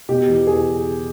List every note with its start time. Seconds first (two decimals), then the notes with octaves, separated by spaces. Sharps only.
0.09 B2 G4
0.28 E2
0.47 G#4